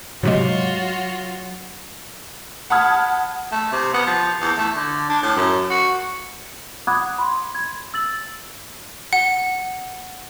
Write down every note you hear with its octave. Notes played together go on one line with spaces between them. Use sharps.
G#2 C3 F#3 G#3 F4 F#4
F#5 A5 B5 D#6 F6 G#6
A3
C3
B3
F3
E2
A3
D3
D4
A2
F#2
F#4
F#5 B5 D6 D#6 F#6 G#6
B5 C6
G#6
E6 A6 F#7
F#5